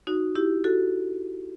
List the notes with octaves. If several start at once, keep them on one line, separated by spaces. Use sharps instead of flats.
D#4 F#4
E4 G4
F#4 A4